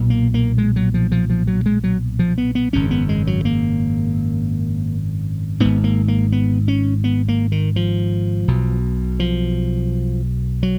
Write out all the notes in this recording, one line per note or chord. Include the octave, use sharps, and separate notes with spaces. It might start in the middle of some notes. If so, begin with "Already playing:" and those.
Already playing: B1 A#2
A#3
A#3
G#3
F#3
F3
F3
F3
F#3
G#3
F#3
F3
B3
B3
G#1 F#2 C#3 C#4
B3
G#3
F#3
A#3
G#1 G#2 B3
A#3
A#3
B3
C#4
B3
A#3
D#3
F3
B1 B2
F3
F#3